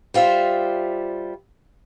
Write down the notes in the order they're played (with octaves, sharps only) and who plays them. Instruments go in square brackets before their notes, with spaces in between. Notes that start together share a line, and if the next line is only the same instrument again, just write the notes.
[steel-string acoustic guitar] G3 F4 C5 E5